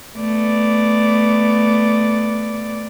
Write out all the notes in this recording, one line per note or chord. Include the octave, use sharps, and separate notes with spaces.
A3 B3 D5